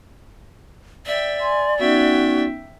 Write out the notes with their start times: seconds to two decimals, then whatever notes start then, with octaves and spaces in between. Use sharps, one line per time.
1.06 D5 E5 G5
1.41 G#5 C6
1.79 B3 C#4 D#4 F#4 E5 G5